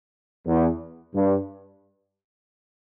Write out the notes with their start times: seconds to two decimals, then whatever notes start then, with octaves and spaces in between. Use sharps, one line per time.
0.47 E2
1.15 G2